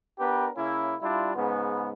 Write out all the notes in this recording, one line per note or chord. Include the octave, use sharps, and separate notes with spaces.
B3 D4 G4 A#4 B4
C#3 A#3 C#4 E4
G3 D4 E4 F4
G#2 C#3 B3